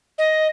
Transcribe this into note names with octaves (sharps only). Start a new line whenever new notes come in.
D#5